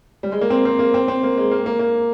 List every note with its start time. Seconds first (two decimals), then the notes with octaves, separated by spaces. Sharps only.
0.23 G3
0.32 G#3
0.41 A#3
0.50 C4
0.65 C4
0.79 A#3
0.94 C4
1.08 C4
1.23 A#3
1.37 G#3
1.51 A#3
1.66 A#3
1.79 A#3